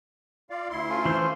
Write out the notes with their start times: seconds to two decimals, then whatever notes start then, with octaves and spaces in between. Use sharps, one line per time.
0.50 F4 D5 F5
0.70 D2 E4 C6
0.89 A3 C#4 F4
1.05 E3 C5